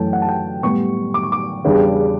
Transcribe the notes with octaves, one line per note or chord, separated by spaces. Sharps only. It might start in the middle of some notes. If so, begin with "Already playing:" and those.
Already playing: F#2 E3 A3 C#4 G5 A5
F#5
A5
G5
A2 G3 B3 C#6
D6
C#6
D6
E2 C#3 G3 D4